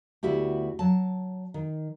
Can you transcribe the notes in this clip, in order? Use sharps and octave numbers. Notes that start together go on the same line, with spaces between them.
D2 B3 E4 F#4 G4
F#3 A5
D#3